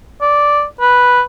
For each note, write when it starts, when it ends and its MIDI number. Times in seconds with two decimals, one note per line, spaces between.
0.21 0.64 74
0.81 1.21 71